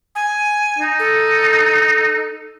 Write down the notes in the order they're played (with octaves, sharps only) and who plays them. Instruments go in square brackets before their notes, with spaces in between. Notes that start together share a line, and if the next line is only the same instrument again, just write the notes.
[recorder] G#5
[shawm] D#4
[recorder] A4